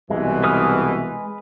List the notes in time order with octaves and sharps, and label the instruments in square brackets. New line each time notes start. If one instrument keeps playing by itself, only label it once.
[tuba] C2 [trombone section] B2 E3 [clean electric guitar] G#3
[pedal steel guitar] B4 D#6 F6